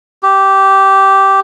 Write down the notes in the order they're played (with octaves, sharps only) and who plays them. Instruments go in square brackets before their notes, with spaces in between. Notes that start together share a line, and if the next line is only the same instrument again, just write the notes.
[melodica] G4